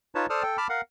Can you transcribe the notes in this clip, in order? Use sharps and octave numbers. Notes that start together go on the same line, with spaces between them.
D#4 F4 B4 C#5 A5
A4 C5 D5 A5 D#6 F6
A4 G5
A5 B5 D6 F6
A#4 F5 F#5